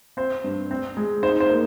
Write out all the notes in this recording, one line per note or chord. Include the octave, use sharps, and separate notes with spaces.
C4 C5
G2
C4
G#3
D#4 C5
C5
A#3